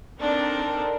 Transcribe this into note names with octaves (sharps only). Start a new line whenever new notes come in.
C4 D4 D#4 A4 A#4